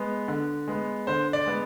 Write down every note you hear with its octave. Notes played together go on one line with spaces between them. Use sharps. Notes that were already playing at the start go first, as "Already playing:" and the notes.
Already playing: G#3 B3
D3
G#3 B3
D3 C5
D5
G#3 B3